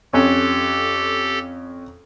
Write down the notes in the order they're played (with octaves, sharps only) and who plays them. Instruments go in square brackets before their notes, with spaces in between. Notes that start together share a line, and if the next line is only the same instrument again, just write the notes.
[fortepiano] F2 C#4 [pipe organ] G4 A4